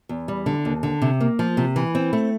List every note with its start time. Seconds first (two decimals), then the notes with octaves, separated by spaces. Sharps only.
0.09 E2
0.28 G3
0.46 D3
0.65 D#2
0.83 D3
1.02 C3
1.21 A#3
1.39 F3
1.57 C3
1.76 E3
1.95 C4
2.13 A3